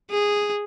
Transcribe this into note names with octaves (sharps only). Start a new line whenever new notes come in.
G#4